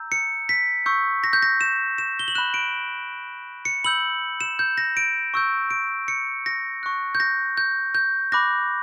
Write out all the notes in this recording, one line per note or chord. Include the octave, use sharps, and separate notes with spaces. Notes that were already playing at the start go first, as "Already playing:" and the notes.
Already playing: A#5 E6 G6
C#7
B6
C#6 E6 G6
A#6
G6
A#6
E7
E7
G7
F#7
B5 F#6 E7
D7
C#7
B5 E6 G6 F#7
E7
G6
A#6
D7
C#6 E6 G6
D7
C#7
A#6
C#6 F#6
G6
A#6
G6
G6
B5 D6 F#6 A#6